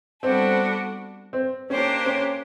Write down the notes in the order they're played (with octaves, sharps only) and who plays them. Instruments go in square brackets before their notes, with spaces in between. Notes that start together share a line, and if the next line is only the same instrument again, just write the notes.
[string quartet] G3 B3 D4 F#4 A4 [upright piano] C4
[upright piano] C4
[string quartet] A#3 D4 G4 C5 [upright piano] C#4
[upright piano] C#4